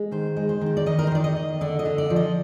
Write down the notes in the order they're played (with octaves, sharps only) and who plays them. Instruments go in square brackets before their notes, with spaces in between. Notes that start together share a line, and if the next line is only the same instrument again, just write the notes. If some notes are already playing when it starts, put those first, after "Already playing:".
Already playing: [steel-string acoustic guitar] G#3
D#3 C5
G#3
C5
D#3 C5
D5
D#3 D#5
A#4
C5
D#3 D5
D#5
D#3
D3 D5
D#5
D3
D5
F3
D#5